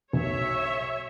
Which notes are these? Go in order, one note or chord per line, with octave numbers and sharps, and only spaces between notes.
B1 C#5 E5